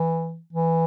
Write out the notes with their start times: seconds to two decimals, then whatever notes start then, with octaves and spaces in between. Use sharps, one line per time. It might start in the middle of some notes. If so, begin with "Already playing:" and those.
Already playing: E3
0.53 E3